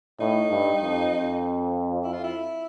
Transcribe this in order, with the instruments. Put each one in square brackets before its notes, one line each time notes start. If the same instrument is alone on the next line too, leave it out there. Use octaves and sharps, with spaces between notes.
[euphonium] A2 [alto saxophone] D#4
[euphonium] G2
F2
F2
[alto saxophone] E4
F4
E4